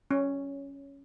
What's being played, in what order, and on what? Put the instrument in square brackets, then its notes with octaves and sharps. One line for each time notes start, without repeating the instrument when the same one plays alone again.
[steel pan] C#4